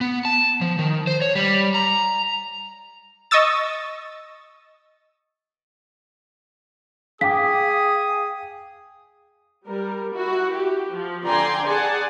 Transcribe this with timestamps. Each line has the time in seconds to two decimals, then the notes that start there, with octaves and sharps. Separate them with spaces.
0.01 B3
0.25 A5
0.61 F3
0.79 D#3
1.07 C5
1.22 C#5
1.35 G3
1.74 A#5
3.31 D#5 C#6 D#6 E6 A6
7.21 G#4 F5 G5 D6 D#6 B6
9.67 G3 A#4
10.15 E4 F#4
10.54 G4
10.94 F3
11.27 D3 D5 G5 G#5 A#5 C6
11.67 G#4 D5 F#5 G#5 A5